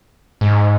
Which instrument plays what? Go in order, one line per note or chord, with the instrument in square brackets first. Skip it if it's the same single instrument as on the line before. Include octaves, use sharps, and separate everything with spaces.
[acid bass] G#2